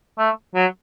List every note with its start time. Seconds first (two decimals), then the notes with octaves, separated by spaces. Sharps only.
0.18 A3
0.55 F#3